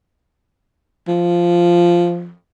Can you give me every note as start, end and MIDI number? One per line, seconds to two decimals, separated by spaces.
1.08 2.33 53